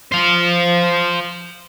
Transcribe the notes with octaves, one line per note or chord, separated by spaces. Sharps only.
C5 F5